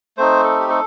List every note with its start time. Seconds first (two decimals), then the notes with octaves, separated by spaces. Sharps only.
0.17 A3 C4 D#4 C5
0.44 A4
0.59 G4
0.70 A4